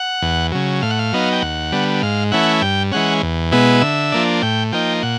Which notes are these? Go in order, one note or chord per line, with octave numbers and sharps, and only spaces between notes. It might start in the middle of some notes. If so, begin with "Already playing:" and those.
Already playing: F#5
E2
C#3 F#3
A2 F5
F#5
F5
F#3 B3 D#4
G5
D#2 F#5
D3 G3 B3
G#2 F5
E3 A3 C#4 E4 F#5
G2 G5
E3 G#3 C#4 F#5
E2
B2 G#3 B3 E4
D3 E5
F3 A#3 D4
A2 G5
F3 A#3 D#4 G5
A#2 F#5